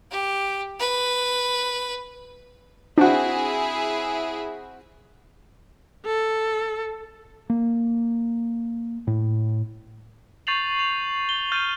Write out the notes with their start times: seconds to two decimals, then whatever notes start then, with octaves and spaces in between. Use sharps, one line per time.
0.11 G4
0.80 B4
2.98 C4 D4 E4 F#4 G#4
6.06 A4
7.50 A#3
9.07 A2
10.47 C#6 G6 A6 C7 F7 F#7
10.79 F7
11.29 G7
11.52 F6 G6 A6 D#7